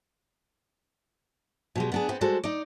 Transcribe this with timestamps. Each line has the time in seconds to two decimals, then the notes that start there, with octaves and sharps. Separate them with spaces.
1.75 B2 G3 G#3
1.92 B3 D4 G#4
2.09 B3 C4
2.21 G3 G#3 F#4 A4 C5
2.44 D#4 D5